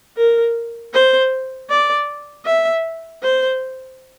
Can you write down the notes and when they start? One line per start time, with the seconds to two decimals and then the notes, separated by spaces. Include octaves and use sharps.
0.17 A#4
0.93 C5
1.70 D5
2.46 E5
3.23 C5